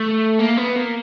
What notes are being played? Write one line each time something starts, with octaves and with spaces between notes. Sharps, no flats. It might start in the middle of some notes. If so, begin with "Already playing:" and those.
Already playing: A3
A#3
B3
A#3